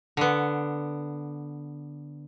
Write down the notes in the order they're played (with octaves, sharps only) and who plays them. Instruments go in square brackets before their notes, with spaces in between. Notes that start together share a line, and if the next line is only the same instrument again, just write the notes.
[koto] D3 B3